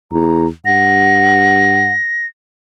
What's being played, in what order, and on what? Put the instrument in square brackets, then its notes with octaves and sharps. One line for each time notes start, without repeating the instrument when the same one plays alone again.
[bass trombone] E2 [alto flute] A#5
[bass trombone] G2 [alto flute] F#5 [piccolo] A#6